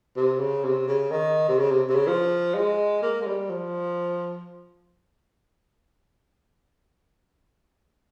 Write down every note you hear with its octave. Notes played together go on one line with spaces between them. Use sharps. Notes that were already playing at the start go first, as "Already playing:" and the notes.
C3
C#3
C3
C#3
D#3
C3
C#3
C3
C3
C#3
F3
G#3
A#3
G#3
G3
F3